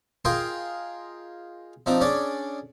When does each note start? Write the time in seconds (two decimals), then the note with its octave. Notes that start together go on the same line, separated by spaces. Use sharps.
0.25 F4 G#4 A#4 D#5 G5 C6
1.86 F3 C4 D4 D#4
2.01 C#4 D4 G#4 D5